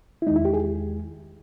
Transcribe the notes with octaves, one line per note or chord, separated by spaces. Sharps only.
E4
E2 D#3 G#3 D#4
E4
G4
G#4